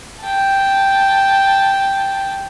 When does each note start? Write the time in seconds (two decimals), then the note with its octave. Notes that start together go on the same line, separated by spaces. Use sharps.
0.23 G5 A5